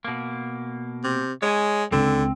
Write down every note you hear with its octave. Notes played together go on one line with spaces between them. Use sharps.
B2 A#3
C3
G#3 C#5 G#5
C#2 D3 C4